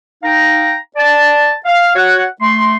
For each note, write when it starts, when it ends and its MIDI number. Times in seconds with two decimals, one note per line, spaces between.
0.23 0.76 63
0.23 0.76 77
0.23 0.76 79
0.23 0.76 82
0.96 1.52 74
0.96 1.52 81
1.65 1.92 77
1.96 2.25 66
1.96 2.25 73
1.96 2.25 78
2.40 2.76 57
2.40 2.76 84